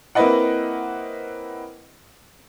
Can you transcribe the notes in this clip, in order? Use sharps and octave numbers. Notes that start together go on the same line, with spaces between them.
A#3 C4 E4 B4 D#5 F#5